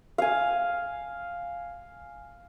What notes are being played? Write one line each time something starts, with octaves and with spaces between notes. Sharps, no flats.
F5 G#5